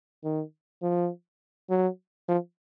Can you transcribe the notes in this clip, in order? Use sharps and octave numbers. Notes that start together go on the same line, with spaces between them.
D#3
F3
F#3
F3